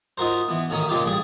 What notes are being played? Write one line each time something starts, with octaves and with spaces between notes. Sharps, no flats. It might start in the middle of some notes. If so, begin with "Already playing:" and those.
D#4 F4 F#4 A#4 C5
E3 B3
A1 D#3 C#4 C#5 A#5 D#6
A#2 C#3 G#3 F4 G4
A1 G3 G#4